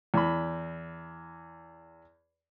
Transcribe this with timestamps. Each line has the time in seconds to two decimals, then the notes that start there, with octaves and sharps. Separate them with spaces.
0.14 E2 B5